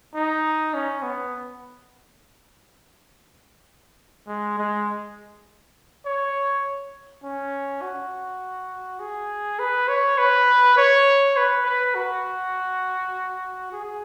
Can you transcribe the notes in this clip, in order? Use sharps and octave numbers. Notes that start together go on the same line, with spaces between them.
D#4
C#4
B3
G#3
G#3
C#5
C#4
F#4
G#4
B4
C#5
B4
C#5
B4
B4
F#4
G#4